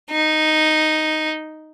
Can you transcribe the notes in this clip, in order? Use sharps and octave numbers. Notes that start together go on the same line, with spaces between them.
D#4